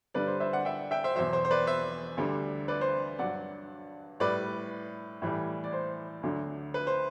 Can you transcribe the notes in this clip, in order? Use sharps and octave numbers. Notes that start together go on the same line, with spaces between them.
G2 D3 G3 B4 D5
C5
C5 E5
D5 F#5
E5 G5
E5 G5
C5 E5
E2 B2 F#3 C5 E5
C5
C5
B4 D5
C5 E5
D2 D3 G3
B4 D5
C5
G2 F#3 D5 F#5
A2 G3 B4 D5
A2 E3 G3
D5
C5
D2 D3 F#3
B4
C5